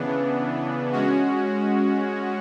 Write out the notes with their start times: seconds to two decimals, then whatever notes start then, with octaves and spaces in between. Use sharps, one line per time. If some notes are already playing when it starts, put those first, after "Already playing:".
Already playing: C#3 E3 B3 D4
0.92 G#3 C#4 F#4